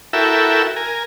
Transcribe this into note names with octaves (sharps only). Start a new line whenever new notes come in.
E4 F#4 A4 A#4 E5 G5
A#4 G#5